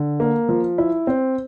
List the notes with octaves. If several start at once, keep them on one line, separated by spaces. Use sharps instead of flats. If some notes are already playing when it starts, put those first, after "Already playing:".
Already playing: D3
A#3
F3
E4
C4